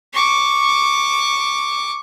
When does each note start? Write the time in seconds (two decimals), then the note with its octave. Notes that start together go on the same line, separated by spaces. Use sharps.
0.13 C#6 D6